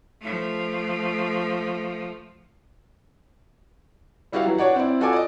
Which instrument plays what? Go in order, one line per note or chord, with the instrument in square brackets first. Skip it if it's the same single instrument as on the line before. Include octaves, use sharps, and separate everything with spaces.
[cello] F3 A3
[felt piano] G3 E4 F#4 G4 F5 F#5
E3 F#3
D4 F#4 C#5 D5 F#5
C4 E4 D5
F4 F#4 A4 D5 G#5 D6
D5 D#5